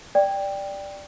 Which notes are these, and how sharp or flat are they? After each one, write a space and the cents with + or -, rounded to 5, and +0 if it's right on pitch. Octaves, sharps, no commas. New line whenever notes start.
D5 +0 G5 +10